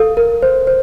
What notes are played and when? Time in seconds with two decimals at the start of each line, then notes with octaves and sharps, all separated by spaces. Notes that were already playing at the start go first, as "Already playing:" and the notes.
Already playing: A4 F5
0.17 A#4
0.42 C5
0.67 C5